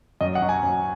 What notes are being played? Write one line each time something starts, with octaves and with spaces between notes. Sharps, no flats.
F#2 D#5
F#5
F#3
G#5
F#2